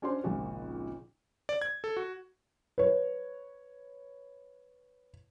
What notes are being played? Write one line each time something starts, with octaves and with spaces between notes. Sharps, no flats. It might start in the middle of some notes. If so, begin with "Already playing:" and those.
C#4 D4 F#4 C5 D5 C6
G#1 C#2 A#2 F3 F#4
D5
G#6
A4
F#4
B4 C#5